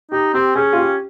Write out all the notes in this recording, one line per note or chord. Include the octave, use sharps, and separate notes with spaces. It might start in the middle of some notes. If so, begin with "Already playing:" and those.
D#4 G4
C4 G4
C#4 G#4
F4
G4